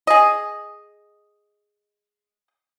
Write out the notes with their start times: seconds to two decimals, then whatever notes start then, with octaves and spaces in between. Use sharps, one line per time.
0.07 G#4 D#5